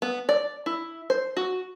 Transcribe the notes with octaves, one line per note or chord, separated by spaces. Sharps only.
B3
D5
E4
C5
F#4